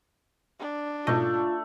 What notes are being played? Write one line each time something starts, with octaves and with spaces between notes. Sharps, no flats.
D4
G#2 B2 A3 F4 D#5